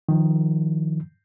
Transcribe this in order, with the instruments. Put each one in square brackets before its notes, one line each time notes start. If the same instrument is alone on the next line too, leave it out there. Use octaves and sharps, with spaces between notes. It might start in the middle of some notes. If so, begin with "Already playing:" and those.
[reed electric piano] D#3 F3